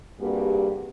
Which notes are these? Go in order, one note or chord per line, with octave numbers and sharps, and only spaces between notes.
G2 C3 G3 A#3 F#4 G#4